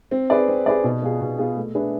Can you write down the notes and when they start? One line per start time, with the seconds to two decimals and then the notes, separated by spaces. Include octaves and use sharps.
0.11 C4
0.30 G#4 B4 D5
0.48 C4
0.66 G#4 B4 D5
0.84 B2
1.02 B3 F4 G#4
1.21 B2
1.39 B3 F4 G#4
1.57 A3
1.75 D4 G#4 B4 E5